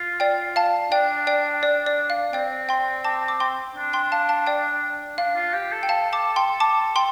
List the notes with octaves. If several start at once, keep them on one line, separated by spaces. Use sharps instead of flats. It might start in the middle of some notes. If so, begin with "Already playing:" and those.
Already playing: F4
D5 G5
F5 A5
D4 D5 G5
D5 G5
D5
D5
F5
C4 D5 G5
G5 C6
A5 D6
D6
G5 C6
D4
G5 C6
F5 A5
F5 A5
D5 G5
D4 F5
F4
G4 F5
A4
G5
F5 A5
A5 D6
G5 C6
A5 D6
G5 C6